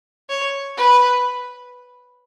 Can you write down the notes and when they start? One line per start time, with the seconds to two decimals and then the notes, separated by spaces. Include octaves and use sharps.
0.29 C#5
0.77 B4